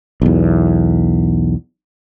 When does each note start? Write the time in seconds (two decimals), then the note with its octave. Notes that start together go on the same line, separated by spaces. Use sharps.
0.22 B1 E2